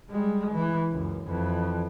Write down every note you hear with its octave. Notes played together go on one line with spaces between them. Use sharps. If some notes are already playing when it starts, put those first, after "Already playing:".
G3 G#3
E3
C#2 F#2
F2 E3